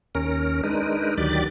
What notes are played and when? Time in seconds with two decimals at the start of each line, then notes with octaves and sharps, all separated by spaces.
0.15 D#2 C#4 A#4
0.64 G#3 D4 D#4 A#4 B4
1.18 D2 D#3 F#3 G4 D5 A6